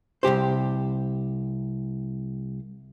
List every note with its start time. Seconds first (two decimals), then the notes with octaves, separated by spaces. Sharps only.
0.23 C2 G#2 G4 C5